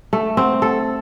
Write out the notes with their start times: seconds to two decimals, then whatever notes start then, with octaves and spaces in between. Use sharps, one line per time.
0.13 A3
0.37 C4
0.62 A4